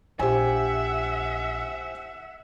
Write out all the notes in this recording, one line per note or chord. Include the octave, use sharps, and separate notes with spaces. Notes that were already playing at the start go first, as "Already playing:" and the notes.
A#1 G4 C5 E5 F#5 G#5